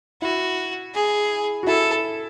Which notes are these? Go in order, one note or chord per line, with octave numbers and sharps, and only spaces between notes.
E4 F#4
G#4
F#4
E4 A4